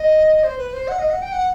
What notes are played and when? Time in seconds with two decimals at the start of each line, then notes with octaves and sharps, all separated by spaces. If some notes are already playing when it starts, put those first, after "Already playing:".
Already playing: D#5
0.44 C5
0.58 B4
0.73 C5
0.88 F#5
0.99 D#5
1.10 F#5
1.22 G5
1.32 F#5